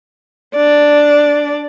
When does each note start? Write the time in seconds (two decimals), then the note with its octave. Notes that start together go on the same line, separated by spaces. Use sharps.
0.56 D4 D5